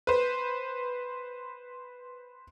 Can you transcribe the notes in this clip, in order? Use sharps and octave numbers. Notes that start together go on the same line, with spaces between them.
B4 C5